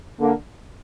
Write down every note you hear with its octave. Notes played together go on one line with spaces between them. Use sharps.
D3 A#3